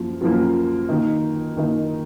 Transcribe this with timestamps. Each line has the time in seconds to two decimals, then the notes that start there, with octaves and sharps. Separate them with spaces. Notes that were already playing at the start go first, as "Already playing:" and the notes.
Already playing: F#2 F3 A#3
0.21 F#2 F3 A#3
0.89 D#3 A#3 D#4
1.57 D#3 A#3 D#4